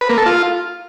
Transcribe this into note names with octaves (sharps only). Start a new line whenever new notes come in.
B4
A#3
A4
F4